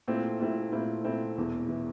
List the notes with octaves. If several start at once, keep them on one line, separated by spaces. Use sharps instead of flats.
A#2 A3 C4 E4
A#2 A3 C4 E4
A#2 A3 C4 E4
A#2 A3 C4 E4
E1 E2 E3
E3